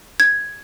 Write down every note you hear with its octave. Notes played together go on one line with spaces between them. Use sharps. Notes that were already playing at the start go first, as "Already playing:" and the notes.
G#6